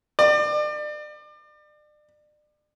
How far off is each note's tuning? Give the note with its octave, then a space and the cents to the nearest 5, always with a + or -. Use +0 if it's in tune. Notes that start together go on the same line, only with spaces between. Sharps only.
D5 +35